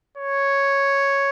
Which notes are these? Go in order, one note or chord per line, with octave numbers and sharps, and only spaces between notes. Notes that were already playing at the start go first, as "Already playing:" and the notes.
C#5